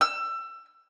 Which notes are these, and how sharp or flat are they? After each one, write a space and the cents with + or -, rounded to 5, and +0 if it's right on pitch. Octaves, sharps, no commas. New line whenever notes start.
E6 +25